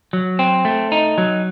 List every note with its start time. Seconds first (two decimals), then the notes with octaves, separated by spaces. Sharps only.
0.13 F#3
0.39 C4
0.65 A3
0.92 D#4
1.18 F#3